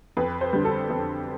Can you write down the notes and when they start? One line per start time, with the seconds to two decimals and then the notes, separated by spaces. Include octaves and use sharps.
0.17 F2 B4
0.41 C5
0.53 D3 G3
0.65 A4
0.90 F2